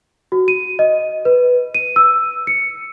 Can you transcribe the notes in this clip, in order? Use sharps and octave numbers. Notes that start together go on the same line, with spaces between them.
F#4
D#7
D#5
B4
D#7
E6
C#7